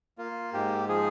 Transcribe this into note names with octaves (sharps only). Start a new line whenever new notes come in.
A#3 F4
G#2 G4
F3 G#4